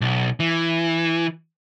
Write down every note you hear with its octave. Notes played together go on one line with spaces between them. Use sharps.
B1
E3